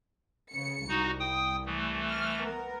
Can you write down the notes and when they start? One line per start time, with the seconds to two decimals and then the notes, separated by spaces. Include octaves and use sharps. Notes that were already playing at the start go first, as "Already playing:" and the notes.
0.53 C#3 C#7
0.89 C2 D#4 F#4
1.19 G5 D#6
1.66 E3 A3
2.10 F6
2.42 B3 A#4